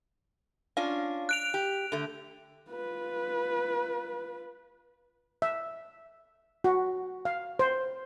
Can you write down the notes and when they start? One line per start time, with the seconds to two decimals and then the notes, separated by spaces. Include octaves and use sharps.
0.77 C#4 D4 F4 F5
1.29 F#6 D7 F7
1.54 G4
1.92 D3 A3
2.70 F4 B4
5.42 E5
6.64 F#4
7.25 F5
7.59 C5